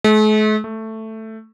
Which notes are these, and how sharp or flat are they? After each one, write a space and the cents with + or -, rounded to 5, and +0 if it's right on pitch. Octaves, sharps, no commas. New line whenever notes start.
A3 -45
A3 +5